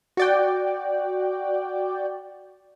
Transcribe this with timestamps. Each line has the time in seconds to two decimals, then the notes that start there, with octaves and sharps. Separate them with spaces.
0.17 F#4 D5 G5